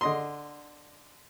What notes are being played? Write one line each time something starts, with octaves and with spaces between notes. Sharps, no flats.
D3 D#5 C6